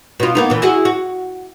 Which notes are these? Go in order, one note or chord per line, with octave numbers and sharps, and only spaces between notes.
B2 F4
A#3 B3 D#4
A#2 E3
E4 F#4 G#4
F#4